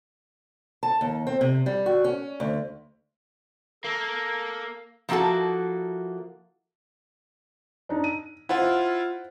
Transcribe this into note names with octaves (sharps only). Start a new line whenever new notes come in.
A5
D#2
C4
C3
G3
F#4
C#4
D2
A#3 A4
F3 A#3 E4 F#4 A4
D4 D#4
D#7
E4 F4 C5 F5 F#5